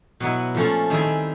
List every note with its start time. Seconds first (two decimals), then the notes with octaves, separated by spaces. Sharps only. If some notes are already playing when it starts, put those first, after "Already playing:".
0.20 B2 F#3 B3 E4
0.55 A#2 F3 A3 C#4
0.90 D#3 G3 C4 E4 G#4